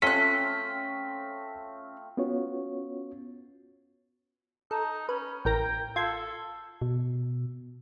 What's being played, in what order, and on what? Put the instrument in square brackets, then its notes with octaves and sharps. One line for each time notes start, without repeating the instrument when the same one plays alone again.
[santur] A3 C4 F4 [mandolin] C#4 F#6 [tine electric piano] B6
[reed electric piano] B3 C#4 F4 F#4 C#5
[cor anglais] D#4 [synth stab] A4
[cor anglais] C#4 [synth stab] B4
[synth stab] A1 A#4 A#6 [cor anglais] G5
[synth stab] F4 C6 G#6 [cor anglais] A4
[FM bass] B2